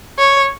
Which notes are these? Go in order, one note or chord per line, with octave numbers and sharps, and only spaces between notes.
C#5